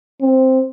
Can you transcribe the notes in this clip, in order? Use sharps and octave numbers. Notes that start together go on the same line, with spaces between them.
C4